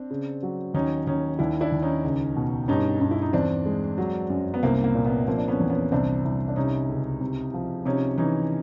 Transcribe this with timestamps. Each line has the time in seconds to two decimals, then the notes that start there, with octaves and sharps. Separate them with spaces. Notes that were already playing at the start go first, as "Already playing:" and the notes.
Already playing: C4 D4
0.10 C#3
0.43 F#3
0.74 D#2 C#4 D#4
1.07 D#2 C#4 D#4
1.39 D#2 D4 E4
1.61 D4 E4
1.72 D#2
1.82 C#4 D#4
2.04 C#2
2.36 B2
2.68 G2 C#4 D#4
3.01 G2
3.11 E4
3.22 D#4
3.33 E2 C4 D4
3.65 G#3
3.98 F#3
4.30 F#2
4.54 B3
4.63 C2 A#3 C4
4.84 A#3
4.95 A#2
5.06 B3
5.27 F3 A#3 C4
5.38 D4
5.48 B3 C#4
5.60 E2
5.70 B3 C#4
5.92 C2 C4 D4
6.25 C2
6.48 D4
6.56 C3 C#4 D#4
6.89 C#2
7.21 C3
7.54 F3
7.85 C3 C#4 D#4
8.18 E3 C#4 D#4